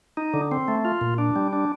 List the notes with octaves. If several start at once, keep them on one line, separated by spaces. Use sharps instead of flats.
D#4
D3
C4
A3
F4
A#2
D4
G3
D4